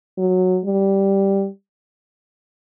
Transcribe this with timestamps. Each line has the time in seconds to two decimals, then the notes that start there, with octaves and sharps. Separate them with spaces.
0.18 F#3
0.65 G3